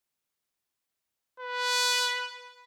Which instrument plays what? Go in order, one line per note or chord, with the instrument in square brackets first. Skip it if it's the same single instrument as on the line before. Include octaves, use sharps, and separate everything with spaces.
[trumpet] B4